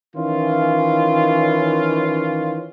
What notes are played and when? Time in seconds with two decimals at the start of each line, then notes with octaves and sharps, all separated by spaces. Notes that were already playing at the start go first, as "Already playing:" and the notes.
0.16 D#3 E3 C#4 F4